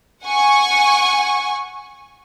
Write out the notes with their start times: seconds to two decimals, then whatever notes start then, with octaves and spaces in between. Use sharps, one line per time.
0.25 F#5 G#5 C#6